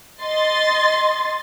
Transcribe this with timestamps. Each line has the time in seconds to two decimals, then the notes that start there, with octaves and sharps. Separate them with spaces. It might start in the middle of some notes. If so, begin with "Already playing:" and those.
0.22 D#5 C6 A6